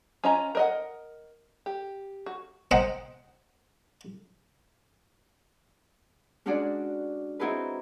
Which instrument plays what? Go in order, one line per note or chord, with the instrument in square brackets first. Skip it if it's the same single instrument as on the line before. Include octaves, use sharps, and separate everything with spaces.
[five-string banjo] C#4 F4 D#5 G#5 A#5
A#4 D#5 F#5
G4
F#4
[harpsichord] C5 D#5 F#5 G5 A#5
[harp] G#3 C#4 D4 F#4 G#4 D5
C4 D#4 E4 F#4 G#4 B4